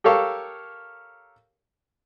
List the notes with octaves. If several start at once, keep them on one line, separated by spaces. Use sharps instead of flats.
G4 A4 A#4 C#5 F5